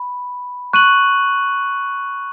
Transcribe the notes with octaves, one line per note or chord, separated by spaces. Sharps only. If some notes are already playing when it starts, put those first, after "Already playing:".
Already playing: B5
C#6 F#6 D#7 F#7